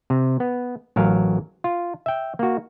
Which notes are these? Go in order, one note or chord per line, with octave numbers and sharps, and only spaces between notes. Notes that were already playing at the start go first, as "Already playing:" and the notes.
C3
B3
A1 F#3 A#4 F5
F4
E5 G5
A#3 F#4